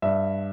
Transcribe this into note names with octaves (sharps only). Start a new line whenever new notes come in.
G2 E5